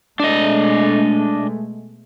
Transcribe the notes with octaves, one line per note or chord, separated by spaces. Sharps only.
B2 G#3 A3 D4 D#5